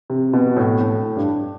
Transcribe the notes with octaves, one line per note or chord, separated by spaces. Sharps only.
C3
B2
A2
A2
G2